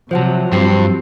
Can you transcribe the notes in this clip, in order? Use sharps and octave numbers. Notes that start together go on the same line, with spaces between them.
C3 F3 F#3 C5 F#5 A5
G2 C4 F4 G4 C7